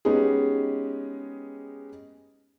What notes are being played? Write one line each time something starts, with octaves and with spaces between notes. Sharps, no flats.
G#3 B3 C#4 D#4 G4 G#4